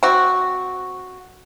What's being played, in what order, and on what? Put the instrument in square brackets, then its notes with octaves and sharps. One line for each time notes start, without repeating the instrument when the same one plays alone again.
[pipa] C4 F#4